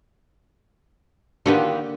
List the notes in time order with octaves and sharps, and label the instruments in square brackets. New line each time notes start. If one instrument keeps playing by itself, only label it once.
[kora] D3 A#3 G4 [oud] D#3 B3 F4